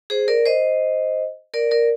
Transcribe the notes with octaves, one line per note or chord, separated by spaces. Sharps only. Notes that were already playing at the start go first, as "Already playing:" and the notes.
G#4 C5
A#4 D5
C5 D#5
A#4 D5
A#4 D5